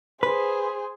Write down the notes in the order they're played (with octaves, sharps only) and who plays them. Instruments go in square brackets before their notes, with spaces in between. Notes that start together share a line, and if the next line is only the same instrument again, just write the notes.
[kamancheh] G#4 C5 [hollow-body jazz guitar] B4